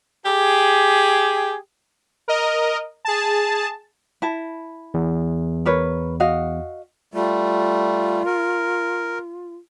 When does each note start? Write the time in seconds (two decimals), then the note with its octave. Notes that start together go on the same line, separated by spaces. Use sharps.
0.25 G4 G#4
2.28 A#4 D#5
3.05 G#4 A5
4.22 E4 A5
4.94 E2
5.66 A#4 B4 C#5
6.20 F#4 D#5 F5
7.14 G3 A3 F4
8.25 A#4